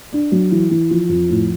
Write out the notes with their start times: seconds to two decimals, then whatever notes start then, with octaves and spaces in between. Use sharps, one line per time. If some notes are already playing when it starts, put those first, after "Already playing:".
0.13 D4
0.32 F#3
0.51 E3
0.71 E3
0.91 F3
1.09 F2
1.29 A2